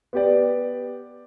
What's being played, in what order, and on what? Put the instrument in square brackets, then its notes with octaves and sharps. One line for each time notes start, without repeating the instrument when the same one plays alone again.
[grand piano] B3 G4 D5